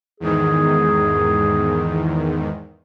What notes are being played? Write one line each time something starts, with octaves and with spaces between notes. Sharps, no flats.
E2 G#2 D#3 G#4